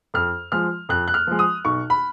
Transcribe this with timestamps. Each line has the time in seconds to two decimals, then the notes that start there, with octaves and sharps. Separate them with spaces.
0.14 F2 F6
0.52 F3 G#3 F6
0.89 F2 F#6
1.08 F#6
1.14 F6
1.27 F3 G#3
1.39 D#6
1.65 B1 C#6
1.90 B5